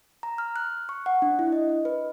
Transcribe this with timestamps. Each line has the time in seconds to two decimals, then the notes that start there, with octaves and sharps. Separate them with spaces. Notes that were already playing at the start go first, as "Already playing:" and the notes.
0.23 A#5
0.38 F6
0.56 F#6
0.89 C#6
1.06 F#5
1.22 D4
1.39 E4
1.52 D#5
1.69 D#5
1.85 B4